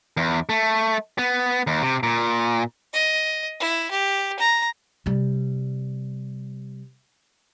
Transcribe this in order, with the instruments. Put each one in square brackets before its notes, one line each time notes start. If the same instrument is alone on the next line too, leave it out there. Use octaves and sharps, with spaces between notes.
[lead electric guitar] E2
A3
B3
D#2
C3
A#2
[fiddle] D#5
E4
G4
A#5
[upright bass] C3 G3